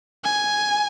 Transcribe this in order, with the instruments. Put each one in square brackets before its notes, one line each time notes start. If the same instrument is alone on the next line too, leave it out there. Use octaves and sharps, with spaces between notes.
[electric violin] G#5